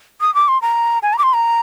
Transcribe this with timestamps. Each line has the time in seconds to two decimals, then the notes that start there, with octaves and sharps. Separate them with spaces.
0.21 D#6
0.35 D6
0.48 C6
0.62 A#5
1.03 G#5
1.13 A#5
1.19 D6
1.23 C6
1.34 A#5